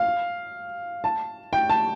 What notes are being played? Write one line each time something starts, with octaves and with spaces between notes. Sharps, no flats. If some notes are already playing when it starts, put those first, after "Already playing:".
Already playing: F5
A5
G5
A5